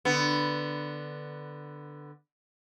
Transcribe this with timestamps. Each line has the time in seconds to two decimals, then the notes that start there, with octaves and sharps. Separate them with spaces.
0.05 D3 B3